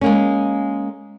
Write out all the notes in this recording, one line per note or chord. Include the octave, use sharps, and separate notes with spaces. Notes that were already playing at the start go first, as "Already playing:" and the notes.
G#3 A#3 C#4